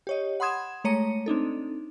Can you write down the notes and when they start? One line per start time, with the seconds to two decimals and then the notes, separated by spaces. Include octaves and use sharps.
0.07 G4 C#5 D#5
0.40 F#5 B5 C6 D#6 G#6 E7
0.84 G#3 A3 C#5 A#5 C#7 D#7
1.26 C4 D4 D#4 A4